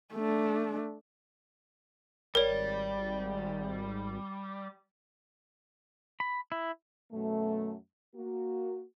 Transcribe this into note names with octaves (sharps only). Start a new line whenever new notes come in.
A3 D4
G#1 G3 A#4 C#5
B5
E4
F#2 B2 A3
A#3 F#4